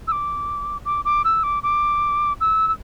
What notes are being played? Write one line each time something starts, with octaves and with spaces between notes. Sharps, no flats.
E6
D6
D6
D6
E6
D6
D6
E6
E6